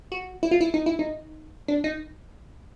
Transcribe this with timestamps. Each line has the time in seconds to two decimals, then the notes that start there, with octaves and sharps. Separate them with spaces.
0.12 F#4
0.43 E4
0.51 F4
0.61 E4
0.74 D#4
0.86 E4
0.99 D#4
1.68 D4
1.84 D#4